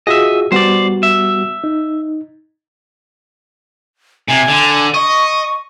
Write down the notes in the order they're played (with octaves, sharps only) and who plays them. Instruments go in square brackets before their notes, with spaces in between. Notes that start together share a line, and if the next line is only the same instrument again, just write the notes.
[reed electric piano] F4 F#4 G#4 [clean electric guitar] D#5 E5
[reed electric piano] G3 B3 F#4 [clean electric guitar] C5 D5
[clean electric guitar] E5
[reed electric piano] D#4
[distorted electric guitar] C3 [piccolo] G#5
[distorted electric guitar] D3
[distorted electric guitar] D#5 [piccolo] C#6